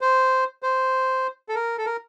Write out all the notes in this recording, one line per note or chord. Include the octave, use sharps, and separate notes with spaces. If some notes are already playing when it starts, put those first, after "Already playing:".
C5
C5
A4
A#4
A4
A#4